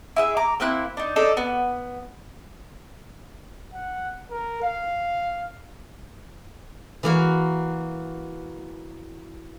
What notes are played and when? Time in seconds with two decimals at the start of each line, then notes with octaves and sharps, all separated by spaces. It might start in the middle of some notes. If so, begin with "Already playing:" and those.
0.16 E4 G#4 E5
0.37 A#5 D6
0.60 A#3 C4 E4 F#6
0.97 D4 D#4
1.16 D4 D#4 A4
1.37 B3
3.73 F#5
4.31 A#4
4.63 F5
7.03 E3 A#3 F#4